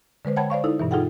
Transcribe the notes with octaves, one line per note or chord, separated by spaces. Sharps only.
D3 G#3 B4 C5
C#5 F#5 G5 A5 B5 G#6
C5 D5 F5 C#6
D#4 E4 A4
G2 B2 E3
D#4 F4 G#4 A4 F#5 G5